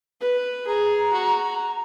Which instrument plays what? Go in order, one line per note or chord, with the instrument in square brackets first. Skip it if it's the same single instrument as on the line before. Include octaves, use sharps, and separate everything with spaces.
[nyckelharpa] B4
[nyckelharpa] G#4 [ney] A#5
[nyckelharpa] F#4